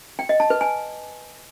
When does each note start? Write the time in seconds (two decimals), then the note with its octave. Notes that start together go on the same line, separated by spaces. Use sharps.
0.19 G5
0.29 D#5
0.40 A5
0.50 B4
0.61 G#5